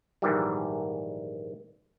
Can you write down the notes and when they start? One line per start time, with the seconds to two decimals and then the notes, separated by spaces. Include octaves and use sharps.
0.22 A#1 G#2 D#3 E3 G3